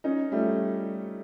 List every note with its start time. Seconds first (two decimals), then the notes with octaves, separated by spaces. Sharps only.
0.04 C#4 D#4
0.32 G3 A3